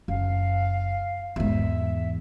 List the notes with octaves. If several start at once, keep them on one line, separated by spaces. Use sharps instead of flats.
F#1 F5
E2 G#2 E5